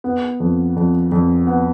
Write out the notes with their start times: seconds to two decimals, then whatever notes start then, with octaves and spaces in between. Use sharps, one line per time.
0.04 B3
0.40 F2
0.76 F2
1.12 F2
1.47 B3